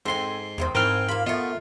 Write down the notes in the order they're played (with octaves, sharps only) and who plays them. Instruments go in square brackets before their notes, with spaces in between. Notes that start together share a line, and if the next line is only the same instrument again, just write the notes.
[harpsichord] G#2 C6 [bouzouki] C4 A4 G#5
[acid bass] E2 [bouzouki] D#3 G#3 C4
[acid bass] G#2 [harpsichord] C4 G5 [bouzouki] E4 G#5 [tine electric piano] A#4 F6
[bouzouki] A#3 F4 [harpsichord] B5
[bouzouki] A3 D#5 [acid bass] B3 [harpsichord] F4